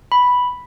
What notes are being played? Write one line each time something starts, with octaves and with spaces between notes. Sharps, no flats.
B5